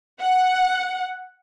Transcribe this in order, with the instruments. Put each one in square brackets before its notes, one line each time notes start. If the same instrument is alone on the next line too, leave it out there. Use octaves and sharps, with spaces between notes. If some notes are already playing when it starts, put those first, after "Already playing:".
[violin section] F#5